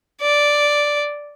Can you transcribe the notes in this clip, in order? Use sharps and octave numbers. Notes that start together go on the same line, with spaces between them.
D5